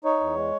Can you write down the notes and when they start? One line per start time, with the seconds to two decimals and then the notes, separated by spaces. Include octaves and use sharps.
0.04 D#4 C#5
0.20 E2
0.36 G#3